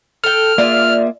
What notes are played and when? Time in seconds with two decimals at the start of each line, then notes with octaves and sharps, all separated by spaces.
0.24 A4 G5 F6
0.58 A#3 F4 G#4 D5 E5